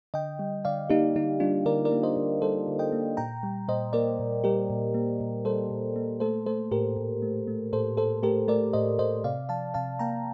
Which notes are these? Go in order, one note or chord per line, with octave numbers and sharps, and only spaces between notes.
D3 D#5 G5
G3
D3 D5 F5
A#3 D#4 G4
D3 D#4
G3 D4 F4
D3 A#4 D5
A#4 D5
A#3
C5 D#5
D3
G3 A4 C5
D3
D#5 G5
A#3
A#2 G5 A#5
G3
A#2 C5 D#5
A#3 A#4 D5
A#2
G3 G4 A#4
A#2
A#3
A#2
G3 A4 C5
A#2
A#3
A3 A4 C5
A3 A4 C5
A2 G4 A#4
A2
A3
A3
A2 A4 C5
A2 A4 C5
A3 G4 A#4
A3 A#4 D5
A2 C5 D#5
A2 C5 D#5
C3 D5 F5
F3 F5 A5
C3 F5 A5
A#3 G5 A#5